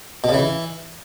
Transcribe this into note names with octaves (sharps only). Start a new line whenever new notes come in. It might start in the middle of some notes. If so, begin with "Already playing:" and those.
B2
C#3
E3